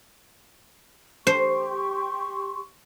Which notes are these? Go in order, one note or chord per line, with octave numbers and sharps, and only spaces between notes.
G4 C5 C6 C#6